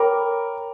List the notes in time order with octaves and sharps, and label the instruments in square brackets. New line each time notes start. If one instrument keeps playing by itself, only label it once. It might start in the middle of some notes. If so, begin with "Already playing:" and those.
Already playing: [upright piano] A#4 [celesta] C#5 G5 B5 D6